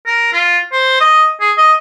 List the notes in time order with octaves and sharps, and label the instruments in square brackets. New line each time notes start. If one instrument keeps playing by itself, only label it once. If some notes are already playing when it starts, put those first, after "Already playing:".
[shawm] A#4
F4
C5
D#5
G#4
D#5